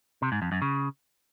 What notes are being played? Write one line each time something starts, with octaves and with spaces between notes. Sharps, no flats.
C3
G#2
F2
F#2
C#3